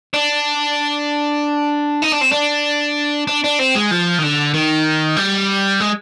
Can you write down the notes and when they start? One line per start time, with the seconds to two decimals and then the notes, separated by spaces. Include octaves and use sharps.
0.14 D4
2.03 D#4
2.13 D4
2.21 C4
2.32 D4
3.27 D4
3.44 D4
3.59 C4
3.75 G#3
3.91 F3
4.18 D#3
4.23 D3
4.54 D#3
5.17 G3
5.80 G#3